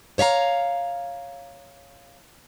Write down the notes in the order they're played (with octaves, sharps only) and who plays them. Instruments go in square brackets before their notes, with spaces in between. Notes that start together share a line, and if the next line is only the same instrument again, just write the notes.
[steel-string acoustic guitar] C5 C#5 E5 F5 A#5